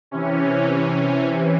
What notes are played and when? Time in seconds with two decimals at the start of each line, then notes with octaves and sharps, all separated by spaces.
0.11 C3 E3 C#4
0.69 C#4
1.25 C3 E3